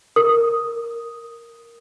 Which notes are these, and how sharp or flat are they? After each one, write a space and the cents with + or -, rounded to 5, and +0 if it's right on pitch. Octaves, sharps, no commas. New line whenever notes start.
A#4 +0 D#6 +0